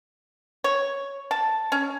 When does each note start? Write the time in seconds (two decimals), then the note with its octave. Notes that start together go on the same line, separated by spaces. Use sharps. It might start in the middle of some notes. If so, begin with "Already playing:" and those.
0.64 C#5
1.31 A5
1.72 C#4